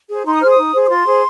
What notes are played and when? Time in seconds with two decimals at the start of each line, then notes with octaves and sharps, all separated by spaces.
0.09 G#4 C5
0.25 D#4 C6
0.34 D#6
0.41 G#4 C5 F6
0.49 D#6
0.58 D#4
0.74 G#4 C5
0.85 D#6
0.89 F4 C6
1.07 G#4 C5